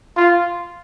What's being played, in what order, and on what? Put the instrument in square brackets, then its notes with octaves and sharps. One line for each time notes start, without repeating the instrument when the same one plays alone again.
[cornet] F4